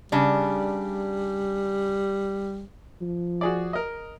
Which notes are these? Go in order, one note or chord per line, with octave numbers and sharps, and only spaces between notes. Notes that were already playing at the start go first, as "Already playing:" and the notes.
C#3 G3 D4
F3
F#4 G#4 D5
A#4 D#5